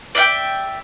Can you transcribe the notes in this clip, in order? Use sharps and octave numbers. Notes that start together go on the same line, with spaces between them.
D5 E5 F5 G5